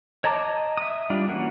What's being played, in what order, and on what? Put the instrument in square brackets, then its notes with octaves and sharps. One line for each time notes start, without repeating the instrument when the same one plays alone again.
[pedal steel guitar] C#5 D#5 A5 A#5 D6
D#5
E5 D#6
G3 D4 F4
E3 A#3 C#4 F#4